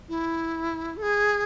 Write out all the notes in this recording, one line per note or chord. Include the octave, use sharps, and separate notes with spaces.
E4
A4
G#4